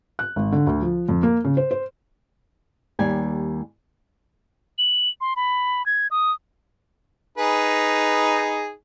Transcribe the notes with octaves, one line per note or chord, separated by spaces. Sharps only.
F#6
G#1
D3
D2
F3
F2
A#3
C#3
C5
C5
D#2 G3 G#5
F#7
C6
B5
G#6
D#6
D#4 G#4 B4